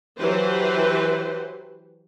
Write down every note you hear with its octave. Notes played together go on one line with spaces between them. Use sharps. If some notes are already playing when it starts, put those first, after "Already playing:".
E3 F#3 G4 B4 C5